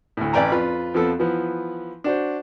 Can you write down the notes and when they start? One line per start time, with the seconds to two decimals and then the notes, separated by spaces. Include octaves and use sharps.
0.17 D2 A2
0.33 A1 B4 D5 G5 G#5 A#5
0.51 F2 F4 B4 B5
0.94 F2 F3 B3 A4
1.19 E3 F3 B3
2.04 D4 F#4 C5